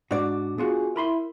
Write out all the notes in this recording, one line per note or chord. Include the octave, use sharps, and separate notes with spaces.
G#2 D4 F#4 D5
B3 F4 F#4 G#4
E4 A#4 B5 C6